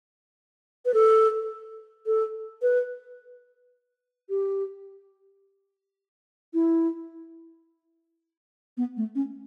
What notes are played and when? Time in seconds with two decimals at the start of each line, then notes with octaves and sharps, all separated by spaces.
0.85 B4
0.94 A4
2.06 A4
2.62 B4
4.29 G4
6.54 E4
8.77 B3
8.97 A3
9.15 C#4